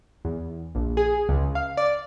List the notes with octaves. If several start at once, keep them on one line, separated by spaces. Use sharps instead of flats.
E2
A#1
G#4
C#2
F5
D5